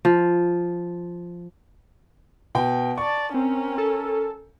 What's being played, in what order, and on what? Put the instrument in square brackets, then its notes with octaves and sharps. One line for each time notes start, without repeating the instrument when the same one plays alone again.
[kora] F3
[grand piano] B2 G5
[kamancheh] D5 A5 [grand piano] C#6
[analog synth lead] C4 [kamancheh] C#4 A#4
[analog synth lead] A4